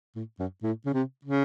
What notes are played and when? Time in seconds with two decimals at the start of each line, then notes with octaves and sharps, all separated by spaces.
0.16 A2
0.39 F#2
0.63 A2
0.86 C#3
0.93 C3
1.25 C#3